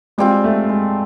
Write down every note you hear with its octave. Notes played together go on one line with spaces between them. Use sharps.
G3 G#3 C4 F4
A3
G#3